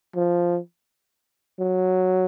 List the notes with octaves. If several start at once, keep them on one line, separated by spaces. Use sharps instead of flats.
F3
F#3